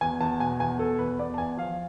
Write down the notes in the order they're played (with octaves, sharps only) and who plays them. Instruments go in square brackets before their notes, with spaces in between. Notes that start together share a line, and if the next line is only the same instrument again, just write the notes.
[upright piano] E2 G#5
E2 A5
B2 G#5
E2 G#5
B2 A4
E2 B4
B3 D5
A5
E2 G#5
F3 F5